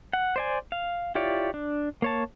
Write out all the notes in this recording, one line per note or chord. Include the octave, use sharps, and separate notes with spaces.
F#5
C5 D5 G#5
F5
E4 F4 G4 C#5 D5
D4
A#3 C#5 A5